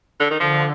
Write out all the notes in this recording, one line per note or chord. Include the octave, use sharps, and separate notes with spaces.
D3
D#3
D3 F3